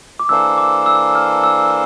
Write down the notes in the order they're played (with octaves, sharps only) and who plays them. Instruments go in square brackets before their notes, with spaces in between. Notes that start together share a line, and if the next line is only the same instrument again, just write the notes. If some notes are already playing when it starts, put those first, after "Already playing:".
[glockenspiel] D6
[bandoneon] E3 A#3 D4 A4 C5 [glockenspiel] E6
[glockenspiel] D6
E6
F6
E6